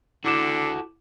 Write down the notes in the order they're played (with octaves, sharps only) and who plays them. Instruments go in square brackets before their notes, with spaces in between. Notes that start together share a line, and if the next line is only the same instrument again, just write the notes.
[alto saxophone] D3 [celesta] E4 D6 E7 [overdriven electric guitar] F#4 A4